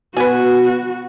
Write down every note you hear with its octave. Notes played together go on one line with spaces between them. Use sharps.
B2 B3 F#4 G#5